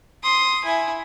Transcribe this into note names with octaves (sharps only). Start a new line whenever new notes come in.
C6 D#6
E4 G#5